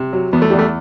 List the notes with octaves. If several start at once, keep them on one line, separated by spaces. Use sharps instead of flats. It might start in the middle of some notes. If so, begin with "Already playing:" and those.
Already playing: C3
F#3
E2 B3
A3
E2 G3
A3